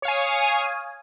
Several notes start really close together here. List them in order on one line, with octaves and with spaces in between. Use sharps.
C#5 F5 G#5 D#6